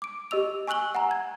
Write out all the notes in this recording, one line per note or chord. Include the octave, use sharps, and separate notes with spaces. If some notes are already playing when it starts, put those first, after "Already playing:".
D6 D7
G4 D#5 E6 F7
G#5 C#6 E6 F#6 F#7 G7
F#5 G#5 A#5
G#6